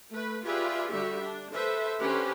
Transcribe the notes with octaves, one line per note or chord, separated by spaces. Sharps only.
A3 B4
F4 G4 G#4 B4 D5 E5
D3 G3 F#4 G4 E5
D4
A4 B4 C5 E5
D3 C#4 G4 B4 C5